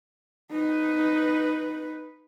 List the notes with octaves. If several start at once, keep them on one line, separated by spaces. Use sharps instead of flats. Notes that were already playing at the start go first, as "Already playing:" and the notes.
D#4 B4